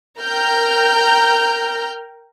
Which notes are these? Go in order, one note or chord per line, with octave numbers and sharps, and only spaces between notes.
A#4 G5 A#5 F6 G6